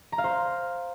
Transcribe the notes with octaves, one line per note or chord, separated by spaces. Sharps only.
A#5
F5
C5